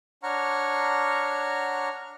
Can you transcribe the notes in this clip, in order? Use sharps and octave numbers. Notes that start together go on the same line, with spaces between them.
D4 C#5 F#5 A#5 C#6 F6